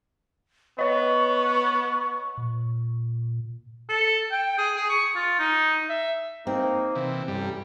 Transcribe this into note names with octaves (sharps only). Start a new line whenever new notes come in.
B3 C#5 D#5 C#6
A#2
A4
G5
G#4
G#4
C#6
F4
D#4
E5
A#3 C4 D#4
C3 E3
A1 G2 G3